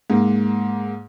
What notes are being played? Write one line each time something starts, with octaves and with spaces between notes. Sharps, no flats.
G#2 A#3